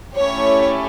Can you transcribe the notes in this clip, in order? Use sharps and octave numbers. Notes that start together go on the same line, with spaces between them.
A3 C#4 E4 G4 C#5